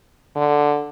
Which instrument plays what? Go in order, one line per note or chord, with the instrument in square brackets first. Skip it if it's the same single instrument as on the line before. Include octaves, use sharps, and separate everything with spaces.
[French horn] D3